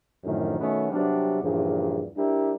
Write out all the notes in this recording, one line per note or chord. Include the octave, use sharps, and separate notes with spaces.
F#2 A2 D3 D#3 F3
B2 D#3 A3 B3 C#4
C3 F#3 G3 B3 D4
E2 G2 A#2 C#3 F3
G3 D4 E4 G4 A#4